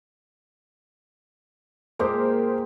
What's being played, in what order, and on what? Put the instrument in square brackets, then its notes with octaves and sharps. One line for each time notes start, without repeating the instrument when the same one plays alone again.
[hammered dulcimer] A#2 G#3 G4 [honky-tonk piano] A#4 C5